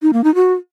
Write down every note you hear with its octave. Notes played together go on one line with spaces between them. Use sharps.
D#4
A#3
D#4
F#4